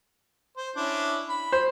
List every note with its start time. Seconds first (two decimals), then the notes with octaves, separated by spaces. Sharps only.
0.57 C5
0.76 C#4 D4 E4
1.29 B5
1.52 C5